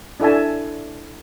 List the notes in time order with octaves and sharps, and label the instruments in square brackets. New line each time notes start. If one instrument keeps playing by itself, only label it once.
[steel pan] D4 E4 A4 E5 G#5 A5